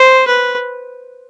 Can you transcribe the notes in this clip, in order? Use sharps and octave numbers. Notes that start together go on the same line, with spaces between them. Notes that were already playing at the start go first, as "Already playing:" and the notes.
Already playing: C5
B4